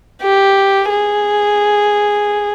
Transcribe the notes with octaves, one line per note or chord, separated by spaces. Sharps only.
G4
G#4